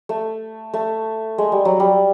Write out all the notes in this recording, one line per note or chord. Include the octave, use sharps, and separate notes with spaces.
A3
A3
G#3
G3
F#3
G3